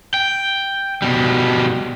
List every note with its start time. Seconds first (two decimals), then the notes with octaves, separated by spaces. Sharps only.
0.14 G5
1.02 B2 G3